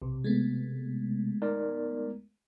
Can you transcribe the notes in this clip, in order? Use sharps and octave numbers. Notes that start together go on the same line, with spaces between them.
B1 C3
G#3 A3 B3
D#4 A#4 D5